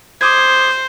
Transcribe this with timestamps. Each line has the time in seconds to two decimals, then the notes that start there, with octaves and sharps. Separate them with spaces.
0.21 C5 D6 D#6 G#6